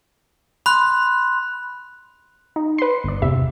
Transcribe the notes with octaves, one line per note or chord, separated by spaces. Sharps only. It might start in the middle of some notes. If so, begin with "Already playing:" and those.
B5 C6 F#6
D#4
B4 C6
G1 D5
E2 C3 E5